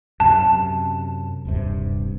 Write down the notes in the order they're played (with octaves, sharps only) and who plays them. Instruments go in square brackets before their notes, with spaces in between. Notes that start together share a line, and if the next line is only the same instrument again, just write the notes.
[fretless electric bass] F#2 C3 [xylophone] A5
[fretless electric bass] D#1 G2 C3